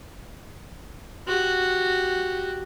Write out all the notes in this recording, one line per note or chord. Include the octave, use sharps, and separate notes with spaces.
F#4 G4